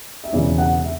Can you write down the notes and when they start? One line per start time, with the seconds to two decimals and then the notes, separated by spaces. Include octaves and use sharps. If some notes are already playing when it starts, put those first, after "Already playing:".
0.24 E5
0.32 E1 E2 C#3 D5
0.58 F#5
0.84 E5